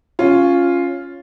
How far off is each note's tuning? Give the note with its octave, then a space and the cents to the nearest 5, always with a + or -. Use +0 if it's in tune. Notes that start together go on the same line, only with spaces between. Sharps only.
C#4 +0 F4 +0